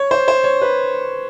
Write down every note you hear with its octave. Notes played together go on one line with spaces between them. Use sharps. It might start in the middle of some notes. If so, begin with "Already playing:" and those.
Already playing: C#5
C5
C5
C#5
B4